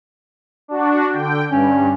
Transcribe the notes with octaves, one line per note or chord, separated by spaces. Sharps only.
D4 F#4
D3 G5
G2 C#4